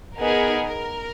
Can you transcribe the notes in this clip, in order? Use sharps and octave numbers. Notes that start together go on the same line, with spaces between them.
B3 D#4 G#4 A#4
A#4